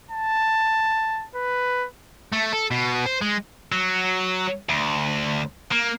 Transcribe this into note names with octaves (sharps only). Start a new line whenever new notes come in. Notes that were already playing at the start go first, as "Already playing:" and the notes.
A5
B4
A3
A4
B2
C5
G#3
F#3
D2
A#3